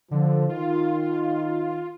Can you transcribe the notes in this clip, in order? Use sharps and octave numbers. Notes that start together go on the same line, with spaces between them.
D3 F3
D#3 F4